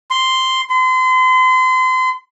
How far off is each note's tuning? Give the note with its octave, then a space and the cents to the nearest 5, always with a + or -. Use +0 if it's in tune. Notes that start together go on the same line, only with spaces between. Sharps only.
C6 +0
C6 -35